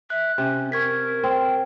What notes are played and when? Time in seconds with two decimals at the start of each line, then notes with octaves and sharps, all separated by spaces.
0.10 E5 F#6
0.38 C3 C#4
0.72 A#4 C#6 G#6 B6
1.24 C4